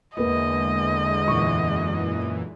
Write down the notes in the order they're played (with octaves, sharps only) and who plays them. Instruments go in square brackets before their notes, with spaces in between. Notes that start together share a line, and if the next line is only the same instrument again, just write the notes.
[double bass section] E2 D3 G#3 [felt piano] A#3 B4 [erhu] D#5
[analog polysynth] F#2 A#2 E3 [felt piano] C#6